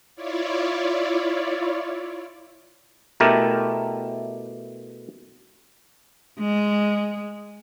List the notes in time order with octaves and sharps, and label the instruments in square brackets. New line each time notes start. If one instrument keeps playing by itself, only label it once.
[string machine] E4 F4 C#5 D5
[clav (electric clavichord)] B2 A3 E4 G4 A#4
[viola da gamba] G#3